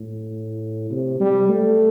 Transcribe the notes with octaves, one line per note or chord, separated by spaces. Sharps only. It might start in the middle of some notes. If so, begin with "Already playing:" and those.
Already playing: A2
C3
G3
A3